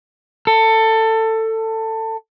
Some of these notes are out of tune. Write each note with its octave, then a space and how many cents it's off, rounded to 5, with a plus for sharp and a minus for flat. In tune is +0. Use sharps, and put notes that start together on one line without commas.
A4 +20